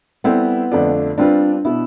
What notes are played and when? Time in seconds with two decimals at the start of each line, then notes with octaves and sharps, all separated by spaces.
0.24 G3 B3 C4 E4 A4 C5
0.71 F2 D3 A3 D4 F4
1.18 G3 C4 D4 F4 B4
1.65 B2 B3 E4